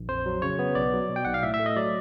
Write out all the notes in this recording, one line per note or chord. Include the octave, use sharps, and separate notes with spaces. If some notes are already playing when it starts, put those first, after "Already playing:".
Already playing: A#1
F2 C5
F#3
C#3 C#5
B3
B1 D5
F#3
B2
G5
B1 F#5
F5
A2 E5
E5
A3
D#5
F#3 D5